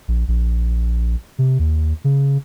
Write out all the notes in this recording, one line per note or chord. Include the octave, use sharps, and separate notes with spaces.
A#1
A#1
C3
D#2
C#3